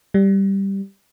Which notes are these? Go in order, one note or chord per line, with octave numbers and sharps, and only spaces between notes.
G3